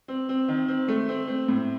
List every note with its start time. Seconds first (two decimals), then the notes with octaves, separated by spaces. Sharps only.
0.08 C4
0.29 C4
0.48 D#3
0.68 C4
0.88 A3
1.09 C4
1.28 C4
1.48 A2